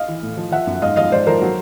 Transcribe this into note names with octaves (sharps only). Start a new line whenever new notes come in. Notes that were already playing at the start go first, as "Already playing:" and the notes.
Already playing: D#5 F5
E3
A2
F3
F3 E5 F#5
F#2
G#2 D#5 F5
F3 D#5 F5
G#2 C5 D5
F3 A#4 C5
F#3